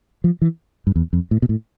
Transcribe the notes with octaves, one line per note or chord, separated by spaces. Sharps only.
F3
E3
G2
E2
F2
A2
B2
A2